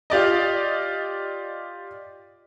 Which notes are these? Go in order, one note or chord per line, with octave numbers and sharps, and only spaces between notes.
F4 G4 D5 D#5